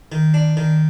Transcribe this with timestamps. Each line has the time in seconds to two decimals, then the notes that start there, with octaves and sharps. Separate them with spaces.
0.12 D#3
0.34 D4
0.57 D#3